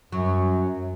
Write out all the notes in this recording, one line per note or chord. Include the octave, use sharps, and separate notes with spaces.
F#2 F#3